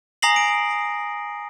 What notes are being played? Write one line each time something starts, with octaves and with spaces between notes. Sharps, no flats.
G#5 A#5 D#6 A#6 C7 F#7
D7